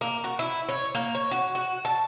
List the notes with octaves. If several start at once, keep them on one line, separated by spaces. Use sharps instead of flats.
A#3
F#4
E4
C#5
A#3
C#5
F#4
F#4
A5